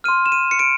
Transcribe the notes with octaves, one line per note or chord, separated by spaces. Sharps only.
C6 F6 D#7
E7
D#7
C#7
D7